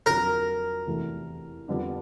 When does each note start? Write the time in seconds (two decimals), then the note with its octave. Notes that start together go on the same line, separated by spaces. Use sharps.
0.06 F2 D3 F#3 A#4
0.87 E2 C3 E3 A3
1.68 F2 D3 G3 B3 D4